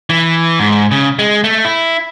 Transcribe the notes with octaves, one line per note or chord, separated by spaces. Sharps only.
E3
G#2
C#3
G#3
A3
E4